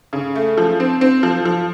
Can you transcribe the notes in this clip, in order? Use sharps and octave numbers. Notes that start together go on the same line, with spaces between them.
C#3
A3
F3
C4
C4
F3
F3